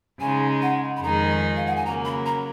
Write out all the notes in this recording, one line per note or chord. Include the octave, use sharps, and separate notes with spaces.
C#3 G#3 D#4 G#5
F#5
B5
F2 D#3 G#3 D#4 G#4 A#5
F5
F#5
G#5
C#3 F#3 A#3 A#5
B5
A#5